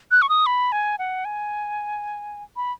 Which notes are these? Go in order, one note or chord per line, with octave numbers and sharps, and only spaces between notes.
F#6
C#6
D#6
B5
G#5
F#5
G#5
B5